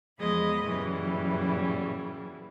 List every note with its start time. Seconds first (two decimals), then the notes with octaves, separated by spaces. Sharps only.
0.19 E2 F3 G#3 D#5 B5
0.64 F#2 A#2 C#3 E3 G3